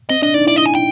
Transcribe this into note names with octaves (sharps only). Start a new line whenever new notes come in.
C4 D#5
D4 D#5
D#4 D5
E4 D5
D#5
G#5
G5